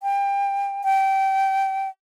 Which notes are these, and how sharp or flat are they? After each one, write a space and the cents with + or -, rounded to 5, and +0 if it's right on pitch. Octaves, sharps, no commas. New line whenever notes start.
G5 +25
G5 -20